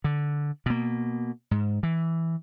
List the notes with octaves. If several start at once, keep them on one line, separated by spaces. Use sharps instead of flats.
D3
B2 A#3
G#2
E3